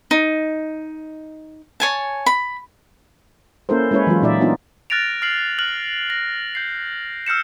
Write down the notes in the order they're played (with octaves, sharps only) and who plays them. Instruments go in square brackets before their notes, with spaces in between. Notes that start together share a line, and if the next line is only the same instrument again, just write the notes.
[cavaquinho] D#4
C#5 G#5 A5
B5
[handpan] A#3 C#4 E4 A4 A#4 C5
G#3 C#4 E4 B4 C#5
E3 F#3 G#3 F4
A#2 D#4 F4 D5 E5
B3 D4 D#4 F4
[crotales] F6 F#6 A6 A#6 D7 F7
F6 C7 F#7
F6 F#6 F#7
A#6
G6 C7
E6 F6 G6 C#7 E7